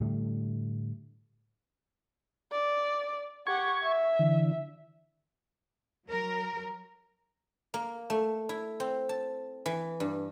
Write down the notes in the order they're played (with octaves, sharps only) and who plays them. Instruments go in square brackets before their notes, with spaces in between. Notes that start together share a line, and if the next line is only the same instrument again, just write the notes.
[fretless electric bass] A2 D3 G3 A3
[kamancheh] D5
[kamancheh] G4 F#5 [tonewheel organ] C#6 G#6
[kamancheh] E5
[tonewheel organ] D3 E3
[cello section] F#3 A#4
[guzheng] A#3
A3
E4
C4
A5
E3
G2